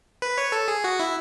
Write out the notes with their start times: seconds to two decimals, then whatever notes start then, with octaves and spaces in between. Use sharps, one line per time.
0.22 B4
0.38 C#5
0.52 A4
0.68 G#4
0.84 F#4
0.99 E4